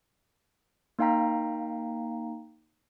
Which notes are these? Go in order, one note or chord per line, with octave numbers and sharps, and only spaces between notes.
A#3 D#4 F5 G5 A#5 B6